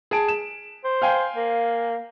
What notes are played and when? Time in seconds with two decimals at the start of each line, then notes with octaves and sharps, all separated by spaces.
0.11 G#4 A5 D7
0.28 E7
0.84 C5
1.02 F5 G5 G#5
1.36 A#3